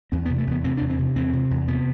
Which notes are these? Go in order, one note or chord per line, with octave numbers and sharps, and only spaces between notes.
E2 C4
B3
C3
A3
E2 B3
C3 C4
E2 D4
C4
C3
E2 C4
C3
E2
C3 B3